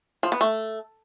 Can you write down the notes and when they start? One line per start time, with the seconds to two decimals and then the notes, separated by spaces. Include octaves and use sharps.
0.23 F3
0.32 B3
0.41 A3